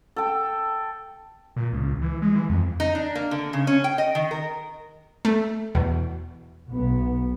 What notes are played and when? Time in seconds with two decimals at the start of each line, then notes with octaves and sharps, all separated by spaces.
0.16 A4 G5
1.56 A#2
1.73 C#2
2.02 E3
2.22 G#3
2.35 E3
2.49 F2
2.80 D#4
2.95 D4
3.15 A#3
3.31 D3
3.53 C#3
3.67 C#4
3.84 G5
3.98 D#5
4.15 D#3
4.31 A#4
5.25 A3
5.75 E2 B2
6.71 B1 B3